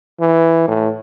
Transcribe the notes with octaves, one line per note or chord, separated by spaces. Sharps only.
E3
A2